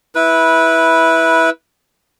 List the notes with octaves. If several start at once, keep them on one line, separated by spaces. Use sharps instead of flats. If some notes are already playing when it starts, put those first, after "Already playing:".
E4 B4